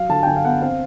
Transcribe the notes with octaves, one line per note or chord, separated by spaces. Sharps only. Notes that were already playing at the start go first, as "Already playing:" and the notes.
Already playing: F#3 F5
D3 A5
G5
D3 G#5
F5
B3 F#5
C4 F5